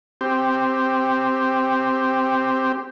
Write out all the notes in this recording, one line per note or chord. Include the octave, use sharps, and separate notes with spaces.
C4 G4